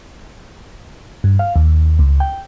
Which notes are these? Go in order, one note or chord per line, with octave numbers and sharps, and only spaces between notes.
G2
F5
D#2
C#2
G5